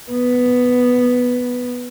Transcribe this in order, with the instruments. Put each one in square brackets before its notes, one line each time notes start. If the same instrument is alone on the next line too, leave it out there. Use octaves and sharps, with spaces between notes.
[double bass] B3